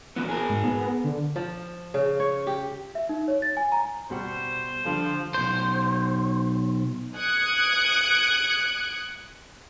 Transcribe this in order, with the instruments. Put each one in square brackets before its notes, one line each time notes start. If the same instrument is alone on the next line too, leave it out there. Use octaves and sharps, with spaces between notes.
[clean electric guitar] A#2 E3 B3
G#4 A#4
[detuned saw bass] G#2
B3
D3
[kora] F3
C#3
C#5
G4
[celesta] E5
D#4
C#5
A6
G#5
A#5
[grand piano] B2 G3 F#5 [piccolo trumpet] C5
[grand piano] D3 G3 D4 [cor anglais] F3
[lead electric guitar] B1 C5
[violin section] D#6 F#6 G#6 C#7 D7